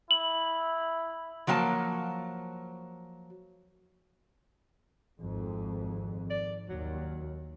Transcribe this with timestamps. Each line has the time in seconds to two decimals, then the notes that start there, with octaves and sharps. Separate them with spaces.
0.11 E4 F#7
1.47 F3 F#3 A#3 G#5 A5
5.21 G#1 F2
6.30 D5
6.69 D#2 F#3